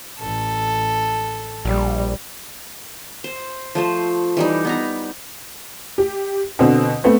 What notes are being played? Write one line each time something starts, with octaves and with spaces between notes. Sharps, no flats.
A1 A4
A#1 G3
C5
F3 A3 C5
E3 G3 D#4
B3 D#4 A#5
G4
B2 D3 C4
A3 B3 C4